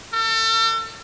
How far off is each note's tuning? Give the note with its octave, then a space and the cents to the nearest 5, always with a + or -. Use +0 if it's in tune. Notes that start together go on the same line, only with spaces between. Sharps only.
A4 +40